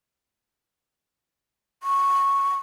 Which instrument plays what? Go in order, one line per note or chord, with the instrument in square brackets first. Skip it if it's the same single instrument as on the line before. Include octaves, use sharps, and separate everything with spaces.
[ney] C#6